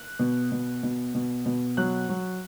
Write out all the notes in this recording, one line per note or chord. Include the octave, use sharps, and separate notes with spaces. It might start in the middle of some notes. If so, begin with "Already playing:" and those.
Already playing: F#6
B2
B2
B2
B2
B2
F#3 F#6
F#3